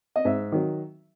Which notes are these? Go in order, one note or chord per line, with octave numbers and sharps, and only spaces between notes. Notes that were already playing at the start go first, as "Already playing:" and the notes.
D#5
G#2 E5
D#3 F#3